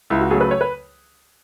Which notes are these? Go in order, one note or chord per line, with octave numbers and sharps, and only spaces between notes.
C#2 E4
F#4
C#3 F#3 A3 G#4
B4
C#5
B4